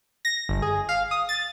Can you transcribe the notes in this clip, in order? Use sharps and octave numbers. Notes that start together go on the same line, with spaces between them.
A#6
G1
G#4
F5
D#6
A6